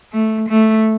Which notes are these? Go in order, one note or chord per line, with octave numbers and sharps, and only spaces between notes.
A3
A3